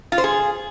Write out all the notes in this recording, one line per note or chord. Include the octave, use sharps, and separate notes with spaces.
F4
C5
G#4